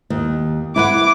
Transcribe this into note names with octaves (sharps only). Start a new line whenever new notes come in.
D#2
E4 B4 F#5 D6